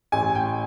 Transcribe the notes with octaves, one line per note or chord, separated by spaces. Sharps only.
A1 G#5
G5